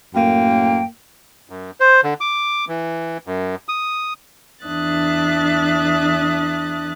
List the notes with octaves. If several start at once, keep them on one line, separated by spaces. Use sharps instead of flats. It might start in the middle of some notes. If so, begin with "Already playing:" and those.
F#2 A2 A#3 G5
F#2
C5
D3
D6
E3
F#2
D#6
E2 D4 E5 D#6 F#6 A6